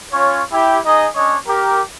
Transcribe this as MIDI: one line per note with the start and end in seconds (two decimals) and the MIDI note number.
0.12 0.41 61
0.12 0.41 65
0.12 0.41 73
0.52 0.79 64
0.52 0.79 67
0.86 1.07 63
0.86 1.07 68
0.86 1.07 75
1.16 1.35 61
1.16 1.35 62
1.16 1.35 73
1.16 1.35 75
1.47 1.80 67
1.47 1.80 70